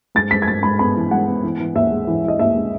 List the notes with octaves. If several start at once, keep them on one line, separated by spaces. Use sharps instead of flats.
G#2 A6
G#2 B6
G#6
G#2 A6
G#2 B5
B3 B5
E3
G#2 F#5
B3
E3
E3
D#2 E5
G#3
E3
E3 D#5
D#2 E5
G#3